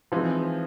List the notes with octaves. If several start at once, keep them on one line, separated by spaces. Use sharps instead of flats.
E3 F3 G#3 C4 D#4